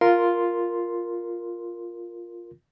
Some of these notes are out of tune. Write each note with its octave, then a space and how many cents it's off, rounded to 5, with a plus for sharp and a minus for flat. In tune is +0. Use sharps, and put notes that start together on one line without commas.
F4 +0 A#4 +0 C6 +0